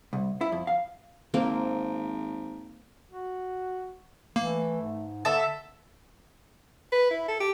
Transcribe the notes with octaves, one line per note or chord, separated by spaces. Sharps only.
C2
E4
F2
F5
G#1 A#3 C4
F#4
E3 A3 A#3
G#2
D3 A#3 A4 E5
B4
E4
A4
G4